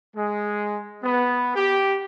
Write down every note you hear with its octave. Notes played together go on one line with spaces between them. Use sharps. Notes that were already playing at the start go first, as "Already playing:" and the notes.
G#3
B3
G4